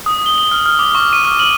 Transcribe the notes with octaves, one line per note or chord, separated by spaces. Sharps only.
D#6
G7
G7
F6
F6
D6
C#6
D#7
F6
F#7